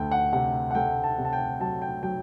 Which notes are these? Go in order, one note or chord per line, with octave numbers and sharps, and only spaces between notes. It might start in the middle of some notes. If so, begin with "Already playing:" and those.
Already playing: D2 A3 G5
F#5
C3 F#5
F#5
A3 G5
A5
C3
A5
G5
F#3 A5
G5
F#3 G5